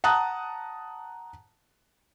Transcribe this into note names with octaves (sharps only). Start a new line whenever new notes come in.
F#5 A5 A#5 D#6 F#6